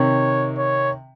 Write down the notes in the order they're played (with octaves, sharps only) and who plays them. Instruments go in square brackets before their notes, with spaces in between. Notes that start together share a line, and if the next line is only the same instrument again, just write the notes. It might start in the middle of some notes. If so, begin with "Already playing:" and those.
Already playing: [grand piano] C3 D#3 [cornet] C#5
[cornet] C#5